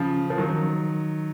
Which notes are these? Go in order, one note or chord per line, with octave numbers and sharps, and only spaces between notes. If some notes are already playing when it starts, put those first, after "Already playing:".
Already playing: C#3 F3
F3
D#3 F#3